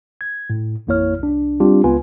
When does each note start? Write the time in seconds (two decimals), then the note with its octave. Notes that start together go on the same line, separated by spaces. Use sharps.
0.21 G#6
0.50 A2
0.87 A1 F2 A#3 E4 C#5 F6
1.20 C2 D4
1.60 G3 C4 D4 F4 G4
1.84 C#2 B3 F4 B4 G#5